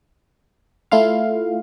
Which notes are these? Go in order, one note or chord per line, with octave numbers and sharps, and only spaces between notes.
A3 E4 F4 F5